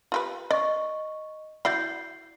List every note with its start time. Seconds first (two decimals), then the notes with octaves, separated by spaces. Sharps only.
0.12 F4 G4 B4
0.51 D5 D#5 C#6
1.65 E4 F#4 D5 G6 C7